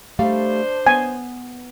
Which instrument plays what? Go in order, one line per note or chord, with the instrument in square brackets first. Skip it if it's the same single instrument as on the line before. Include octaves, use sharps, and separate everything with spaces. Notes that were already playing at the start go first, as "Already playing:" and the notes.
[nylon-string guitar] G3 A3 F5 [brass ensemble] D4 C5
[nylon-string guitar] B3 [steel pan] G#5